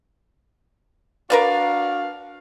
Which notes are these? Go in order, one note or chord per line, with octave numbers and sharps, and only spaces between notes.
D4 F#4 A#4 B4 D5 F5